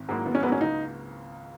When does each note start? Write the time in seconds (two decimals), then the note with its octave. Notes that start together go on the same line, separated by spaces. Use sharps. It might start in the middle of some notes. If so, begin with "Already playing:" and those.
Already playing: G#1
0.09 G#2 F#3 A#3 E4
0.25 G#1 B3
0.35 C#4
0.43 G#2 F#3 A#3 B3 E4
0.52 C#4
0.61 C#2 D#4